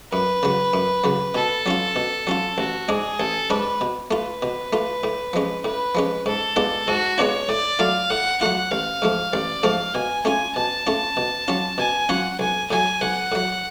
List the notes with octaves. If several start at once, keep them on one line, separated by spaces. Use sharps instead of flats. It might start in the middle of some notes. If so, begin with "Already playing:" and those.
F#2 B4
C#3 F#3
F#2
C#3 F#3
B2 A4
F#3 C#4 F4
B2
F#3 C#4 F4
A1 F#4
G#2 G#3 D4 G#4
A1 A4
G#2 G#3 D4 B4
B2
A3 F4 B4
B2
A3 F4
A2
F3 G#3 C#4
A2 B4
F3 G#3 C#4
G#2 A4
G#3 B3 D4 F4
G#2 F#4
G#3 B3 D4 F4 C#5
A2 D5
F#3 A3 F4 F5
A2 F#5
F#3 A3 F4 F#5
A1 F5
G#2 F3 A3
A1 D5
G#2 F3 A3 F5
B2 G#5
A3 C#4 F4 G#5
B2 A5
A3 C#4 F4
B2
F#3 C#4 F4
B2 G#5
F#3 C#4 F4 F#5
B1 G#5
A2 F#3 G#5
B1 F#5
A2 F#3